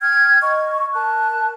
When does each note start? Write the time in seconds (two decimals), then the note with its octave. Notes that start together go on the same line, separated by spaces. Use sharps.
0.01 G5 F6 G#6
0.42 D#5 C#6
0.93 A#4 A5 F#6